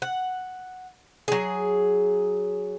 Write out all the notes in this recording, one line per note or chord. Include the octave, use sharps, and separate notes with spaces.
F#5
F#3 G#4